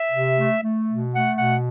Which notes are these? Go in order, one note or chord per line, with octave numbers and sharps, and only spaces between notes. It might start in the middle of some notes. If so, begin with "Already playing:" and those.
Already playing: E5
C3
A3
A3
B2
A3 F#5
B2 F#5